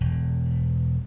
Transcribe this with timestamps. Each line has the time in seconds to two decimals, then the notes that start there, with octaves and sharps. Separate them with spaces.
0.01 E1